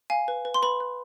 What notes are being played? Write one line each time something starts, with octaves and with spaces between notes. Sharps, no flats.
F5 G#5
B4
B4
C6
B4 B5
B4